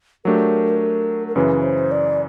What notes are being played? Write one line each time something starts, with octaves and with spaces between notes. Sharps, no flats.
F#3 A3 D4 G4 A#4
A#4
F#2 C#3 E3 B4
C5
D5